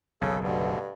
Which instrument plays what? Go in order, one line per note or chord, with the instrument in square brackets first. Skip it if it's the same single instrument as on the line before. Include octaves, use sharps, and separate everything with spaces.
[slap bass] F#1 B1 [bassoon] C#3 [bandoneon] A4
[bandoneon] D2 B2 D3 [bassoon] G2